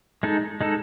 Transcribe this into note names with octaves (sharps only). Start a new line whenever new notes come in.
G#3 D#4 A4
G#3 D#4 A4